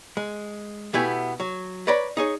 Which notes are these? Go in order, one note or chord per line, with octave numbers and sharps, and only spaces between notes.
G#3
B2 A3 B3 E4 G4 G#5
F#3
B4 C#5 D5 A#5 B5
D#4 G#4 C#5